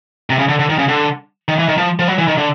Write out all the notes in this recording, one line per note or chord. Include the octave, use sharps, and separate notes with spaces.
C3
C#3
D3
D3
D#3
C#3
D3
D#3
E3
D#3
F3
F3
F#3
E3
D#3
D3